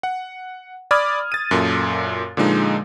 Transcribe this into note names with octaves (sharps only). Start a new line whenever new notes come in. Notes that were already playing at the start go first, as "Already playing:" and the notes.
F#5
D5 B5 D6 D#6 F6 G#6
A6 D#7
F#2 A#2 A4
A#2 D3 F3 G#3 D#4